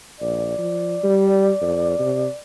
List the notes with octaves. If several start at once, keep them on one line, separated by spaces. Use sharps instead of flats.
A#1 D5
F3
G3
F2
C3